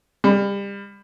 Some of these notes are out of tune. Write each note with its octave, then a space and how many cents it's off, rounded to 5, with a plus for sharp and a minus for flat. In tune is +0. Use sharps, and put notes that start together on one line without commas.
G3 +30